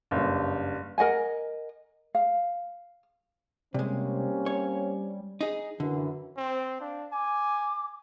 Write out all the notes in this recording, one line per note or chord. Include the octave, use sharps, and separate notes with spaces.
F#1 G2
A#4 D#5 F#5 G#5
F5
C3 G3 G#3 A#3 C4 C#4
C#5
D#4 G#4
F#2 D3 E3
C4
D4 F5
G#5 D6